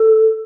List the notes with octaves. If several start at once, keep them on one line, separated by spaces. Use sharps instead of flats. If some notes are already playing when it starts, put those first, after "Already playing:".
Already playing: A4